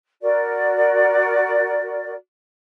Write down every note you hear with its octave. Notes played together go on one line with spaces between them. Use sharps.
F#4 A#4 D5